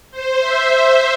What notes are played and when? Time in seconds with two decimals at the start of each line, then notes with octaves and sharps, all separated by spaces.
0.11 C5
0.40 E5
0.68 E5